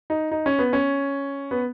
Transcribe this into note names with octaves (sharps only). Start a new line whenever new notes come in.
D#4
D#4
C#4
B3
C#4
B3